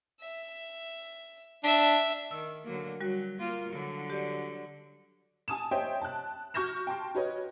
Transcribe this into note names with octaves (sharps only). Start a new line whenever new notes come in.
E5
D4 E5
D#3 E6
D3 F#3 A#3
F#3 G3 F#4
A#3 F4 A#4
D3 F#3
G4 D5
G#5 A5 D#6 E7
C5 C#5 D#5 E5 G5
A5 F#6
F#4 C#6 F6 G6 A#6 E7
G5 A5 C6
F#4 B4 C#5 D#5